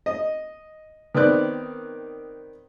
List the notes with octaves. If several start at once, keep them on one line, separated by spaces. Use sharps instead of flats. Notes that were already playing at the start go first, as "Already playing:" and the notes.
D#5
D#3 B3 C4 D5 F#6